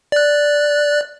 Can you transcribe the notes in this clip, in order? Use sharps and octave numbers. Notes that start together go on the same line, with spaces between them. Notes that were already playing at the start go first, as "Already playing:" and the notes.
D5 F#6